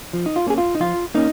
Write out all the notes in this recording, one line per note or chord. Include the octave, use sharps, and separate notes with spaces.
F3
D#4
F4
A#3 C#4 G#4
F4
D#4
F3 F4
A#3 C#4 D#4